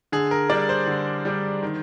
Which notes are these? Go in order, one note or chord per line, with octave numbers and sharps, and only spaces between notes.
D3 G#4
A#4
G3 D4 D5
C5
D3
G3 D4
D#3